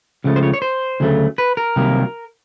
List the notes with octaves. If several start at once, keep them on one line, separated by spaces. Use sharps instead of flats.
C#2 C#3 F3 A3
C5
C#5
C#5
C5
D2 C#3 F#3 A3
B4
A#4
C2 C3 D#3 F#3 A#3